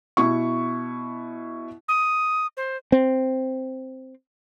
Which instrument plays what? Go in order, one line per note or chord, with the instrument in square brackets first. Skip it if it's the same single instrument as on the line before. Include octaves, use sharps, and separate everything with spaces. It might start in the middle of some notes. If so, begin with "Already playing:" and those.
[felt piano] B2 E4 C#6
[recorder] D#6
C5
[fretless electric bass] C4